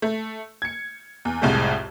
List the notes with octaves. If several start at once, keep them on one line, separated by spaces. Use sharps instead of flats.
A3
G#6 C#7
E2
C2 F2 A2 G#3 A3